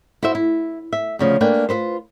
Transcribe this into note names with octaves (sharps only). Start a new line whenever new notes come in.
E4 F#4 C5 E5
E4
E5
D2 C#3 F3
A3 A#3 D4 B4 G5 G#5
F4 A4 B4 C5